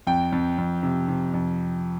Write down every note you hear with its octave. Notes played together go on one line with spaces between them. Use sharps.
F2 G5
F2
F2
C3
C3
F2